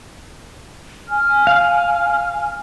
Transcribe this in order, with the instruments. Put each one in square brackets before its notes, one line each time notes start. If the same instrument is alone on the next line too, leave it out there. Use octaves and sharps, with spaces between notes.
[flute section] G#5 F6
[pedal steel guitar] F5